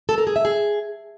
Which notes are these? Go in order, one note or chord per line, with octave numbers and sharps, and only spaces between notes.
A4
A#4
G#4
E5
G#4